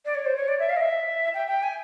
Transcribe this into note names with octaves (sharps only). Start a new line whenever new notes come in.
D5
C#5
C5
C#5
D5
E5
F5
D#5
E5
G5
G5
G#5